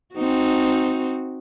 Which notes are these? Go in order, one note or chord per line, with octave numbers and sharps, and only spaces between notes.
C4 D#4 F#4